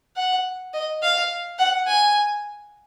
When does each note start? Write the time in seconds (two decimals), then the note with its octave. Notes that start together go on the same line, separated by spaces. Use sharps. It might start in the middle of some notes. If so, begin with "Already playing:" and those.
0.16 F#5
0.73 D#5
1.02 F5
1.59 F#5
1.87 G#5